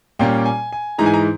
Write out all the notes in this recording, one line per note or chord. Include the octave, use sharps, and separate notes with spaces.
A#2 G3 A#3 C#4 G5
G#5
G#5
G#2 E3 G#3 A#5
G#5
A#5